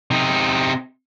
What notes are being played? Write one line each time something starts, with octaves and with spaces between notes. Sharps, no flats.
C3 D#4